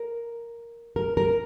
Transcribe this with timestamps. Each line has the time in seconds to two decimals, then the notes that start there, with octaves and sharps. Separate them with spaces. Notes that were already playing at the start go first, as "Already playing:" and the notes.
Already playing: A#4
0.96 A#4
1.17 A#4